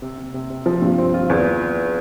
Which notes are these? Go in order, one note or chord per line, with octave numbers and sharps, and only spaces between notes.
C3
C3
C3
C3
F3
G2
C4
F4
E2